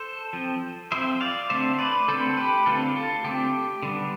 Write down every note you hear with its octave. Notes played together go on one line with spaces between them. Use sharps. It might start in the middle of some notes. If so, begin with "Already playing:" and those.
Already playing: A4 C5
F3 C4
F3 C4 C5 E5
D5 F5
D3 A3 C4 C5 E5
B4 D5
D3 A3 C4 A4 C5
G4 B4
D3 A3 C4 F4 A4
F4 A4
D3 A3 C4 G4
D3 G3 B3